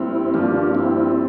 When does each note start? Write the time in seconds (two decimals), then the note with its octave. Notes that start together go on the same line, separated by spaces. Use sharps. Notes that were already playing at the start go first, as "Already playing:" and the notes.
Already playing: G2 F3 A#3 C4 E4
0.34 G2 F3 A#3 D4 F4
0.75 C4 E4